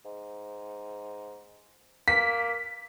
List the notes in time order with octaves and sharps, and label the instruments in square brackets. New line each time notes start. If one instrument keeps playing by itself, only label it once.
[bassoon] G#2
[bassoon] A#3 [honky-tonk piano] B6